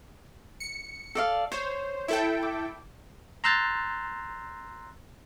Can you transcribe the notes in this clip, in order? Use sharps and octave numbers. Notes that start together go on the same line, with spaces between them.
C#7
A4 D5 F5
C5 C#5
E4 A4 G5
D6
A#5 C6 E6 F#6 G6 A6